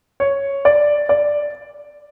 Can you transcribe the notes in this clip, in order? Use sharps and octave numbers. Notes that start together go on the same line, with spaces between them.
C#5
D5
D5